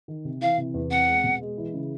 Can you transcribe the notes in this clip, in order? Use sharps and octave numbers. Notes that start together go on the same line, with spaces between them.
D#3
C3
E3 F5
C3
E2
C4 F#5
G#3
B2
G#3
E3
C#3